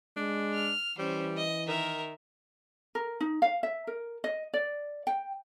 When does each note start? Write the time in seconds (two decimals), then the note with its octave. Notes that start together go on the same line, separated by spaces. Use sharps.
0.17 G#3 D4
0.54 F6
0.98 E3 G3 C#4 C5
1.37 D#5
1.68 D#3 A#4 E5
2.95 A#4
3.21 D#4
3.42 F5
3.63 E5
3.87 A#4
4.24 D#5
4.54 D5
5.07 G5